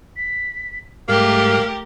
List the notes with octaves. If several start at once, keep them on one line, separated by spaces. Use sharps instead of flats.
B6
G#2 G3 A3 A#3 G4 A#4 F6